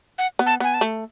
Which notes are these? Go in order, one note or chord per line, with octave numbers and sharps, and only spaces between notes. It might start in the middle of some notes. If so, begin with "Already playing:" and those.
F#5
B3
A5
B3 G#5
A5
A3